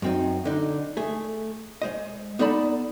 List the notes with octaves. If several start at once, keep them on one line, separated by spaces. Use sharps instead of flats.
F#2 C4 D#4
D3 D#4
A3 G#4
G#3 C5 D#5
B3 D#4 A4 D5 A5 B5